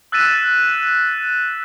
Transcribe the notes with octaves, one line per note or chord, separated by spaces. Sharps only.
E6 F#6 A6 B6 D#7 E7